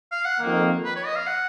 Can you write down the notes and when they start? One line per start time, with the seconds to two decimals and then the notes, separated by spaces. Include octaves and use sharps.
0.12 F5
0.25 F#5
0.39 F2 D#3 A#3
0.85 B4
0.96 C#5
1.06 D#5
1.16 F5
1.27 F#5